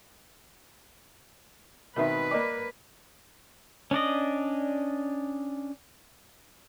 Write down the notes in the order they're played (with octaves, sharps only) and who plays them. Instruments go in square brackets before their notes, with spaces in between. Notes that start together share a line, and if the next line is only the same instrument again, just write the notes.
[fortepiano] B2 D#3 C4 [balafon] A#4 E5 [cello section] B4
[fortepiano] A#3 D6 [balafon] D5 D#5
[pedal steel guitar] C#4 D4 D5 D#5